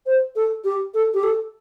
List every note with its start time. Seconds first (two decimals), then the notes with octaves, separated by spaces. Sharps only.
0.06 C5
0.35 A4
0.64 G4
0.94 A4
1.14 G4
1.23 A4